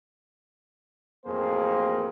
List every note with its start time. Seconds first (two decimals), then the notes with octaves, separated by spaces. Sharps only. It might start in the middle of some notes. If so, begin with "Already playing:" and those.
1.26 A1 F2 A#3 G#4 C5